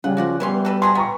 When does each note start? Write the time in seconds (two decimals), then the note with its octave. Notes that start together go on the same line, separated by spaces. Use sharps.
0.04 C#3 G3 F#5
0.17 F3 F#4 D5 F#5
0.40 E3 G3 B3 C#4 C6
0.65 F#4 A4 B4
0.82 F#3 G#4 C5 C6
0.95 B3 G5 A#5 C#6